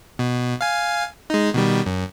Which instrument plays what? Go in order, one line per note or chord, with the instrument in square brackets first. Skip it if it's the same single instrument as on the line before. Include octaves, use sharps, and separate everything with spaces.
[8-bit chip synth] B2
F5 G#5
G#3 D#4
B2 D#3 G3
F#2